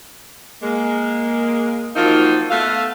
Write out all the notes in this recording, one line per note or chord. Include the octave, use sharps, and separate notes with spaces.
G#3 A#3
F3 F#3 A#3 C4 D#4 F4
A3 B3 A4 F5